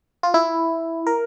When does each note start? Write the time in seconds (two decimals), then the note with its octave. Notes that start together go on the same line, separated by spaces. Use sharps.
0.23 F4
0.34 E4
1.07 A#4